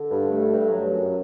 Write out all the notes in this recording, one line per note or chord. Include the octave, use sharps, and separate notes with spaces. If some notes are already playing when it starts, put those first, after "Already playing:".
Already playing: D3
G2
A3
G2
F#3
F#2